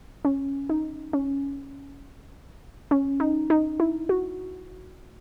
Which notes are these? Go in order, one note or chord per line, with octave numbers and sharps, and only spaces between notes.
C#4
D#4
C#4
C#4
D#4
D#4
E4
F#4